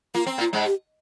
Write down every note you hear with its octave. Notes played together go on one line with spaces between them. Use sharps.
A#3 F4
C4
A#2 A#3 F4
G#2 G#3
G4